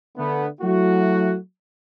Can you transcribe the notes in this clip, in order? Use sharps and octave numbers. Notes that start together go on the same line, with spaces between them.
D3 A3 B3
F#3 A3 E4 F#4